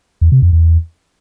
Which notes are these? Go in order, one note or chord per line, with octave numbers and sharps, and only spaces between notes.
E2
C3
F2
E2